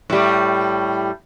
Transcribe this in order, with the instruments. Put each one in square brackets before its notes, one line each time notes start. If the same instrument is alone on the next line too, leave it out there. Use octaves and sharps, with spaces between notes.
[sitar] A2 G3